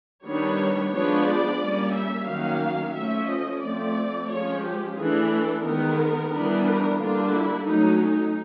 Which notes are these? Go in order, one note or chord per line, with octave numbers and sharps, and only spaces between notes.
D#3 G3 B3 D4 C#5
F3 G#3 B3 D4 C#5
D5
G3 A#3 C#4
E5
D#3 F#3 A#3 C#4 F5
F3 A3 C#4 E5
D#5
F3 A3 C4 D5
F3 G#3 C#4 C#5
G4
E3 A3 D4 G#4
A4
D#3 G#3 B3 A#4
E3 G3 B3 D4
A#4
D3 G3 A#3 D4 F4
E4
F#3 A3 C#4 D#4
D#4